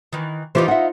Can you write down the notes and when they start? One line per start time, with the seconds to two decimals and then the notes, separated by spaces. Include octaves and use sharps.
0.13 D#3 E3
0.55 E3 D#4 F4 G4 C5
0.68 E5 F#5